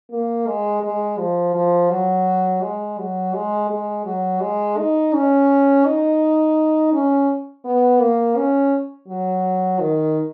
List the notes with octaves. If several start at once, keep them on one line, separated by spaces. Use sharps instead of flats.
A#3
G#3
G#3
F3
F3
F#3
G#3
F#3
G#3
G#3
F#3
G#3
D#4
C#4
D#4
C#4
B3
A#3
C#4
F#3
D#3